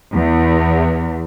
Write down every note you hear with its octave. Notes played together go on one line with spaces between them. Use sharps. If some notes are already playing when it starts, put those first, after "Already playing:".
E2